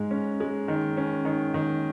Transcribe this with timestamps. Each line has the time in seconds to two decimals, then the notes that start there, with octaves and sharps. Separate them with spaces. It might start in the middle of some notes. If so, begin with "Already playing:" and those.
Already playing: G#2 G#3
0.11 C#4
0.40 G#3
0.68 D#3
0.97 C#4
1.25 D#3
1.54 D#3